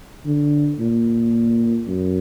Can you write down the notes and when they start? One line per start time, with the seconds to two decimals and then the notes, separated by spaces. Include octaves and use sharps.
0.25 D3
0.79 A#2
1.88 F#2